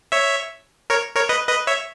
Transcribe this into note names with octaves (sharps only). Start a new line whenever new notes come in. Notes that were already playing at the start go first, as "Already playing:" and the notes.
C#5 E5
A#4 C#5
A#4 C#5
B4 D#5
B4 D#5
C#5 E5